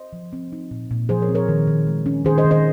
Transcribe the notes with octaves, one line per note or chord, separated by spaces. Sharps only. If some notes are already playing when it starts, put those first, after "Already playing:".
Already playing: C5 D#5
F3
C4
D#4
A#2
A#2
F3 G#4 C5
A#4 C#5
C4
A#4 C#5
D#3
D#3
G#3
C#4
D#3 G#4 C5
C5 D#5
D#3
C5 D#5